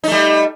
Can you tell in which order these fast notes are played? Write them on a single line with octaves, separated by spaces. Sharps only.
D#4 A3 G3